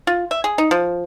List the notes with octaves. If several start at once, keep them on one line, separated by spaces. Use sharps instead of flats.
F4
E5
G#4
D#4
F3